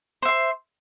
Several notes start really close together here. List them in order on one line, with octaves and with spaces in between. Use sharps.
C5 E5 C6